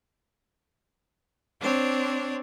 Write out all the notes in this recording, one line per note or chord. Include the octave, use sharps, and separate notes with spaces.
C4 D4 C5 C#5